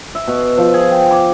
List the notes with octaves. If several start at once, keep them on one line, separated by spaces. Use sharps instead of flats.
E5
B2
F3
G#4
G5
D6